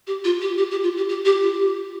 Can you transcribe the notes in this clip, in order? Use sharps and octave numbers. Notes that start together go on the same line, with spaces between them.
G4
F4
G4
G4
G4
F4
G4
G4
G4
F4
G4